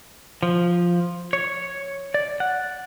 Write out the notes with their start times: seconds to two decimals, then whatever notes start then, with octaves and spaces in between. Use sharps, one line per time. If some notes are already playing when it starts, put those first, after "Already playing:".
0.43 F3
1.33 C#5
2.14 D5
2.40 F#5